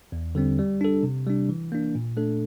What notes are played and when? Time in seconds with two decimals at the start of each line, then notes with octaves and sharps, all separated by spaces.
0.12 E2
0.35 D3 G3 C4
0.58 G3
0.81 D4 A4
1.03 C3
1.27 G3 D4
1.49 E3
1.72 A#3 D4
1.95 A#2
2.17 A3 D4 A4